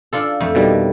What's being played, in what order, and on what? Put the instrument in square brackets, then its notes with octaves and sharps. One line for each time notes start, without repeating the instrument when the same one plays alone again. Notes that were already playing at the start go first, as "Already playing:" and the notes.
[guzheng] D4 F4 A4
F2 A3
[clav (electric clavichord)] B2 D#3 G3